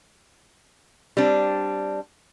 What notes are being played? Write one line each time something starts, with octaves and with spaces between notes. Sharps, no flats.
G3 C4 D4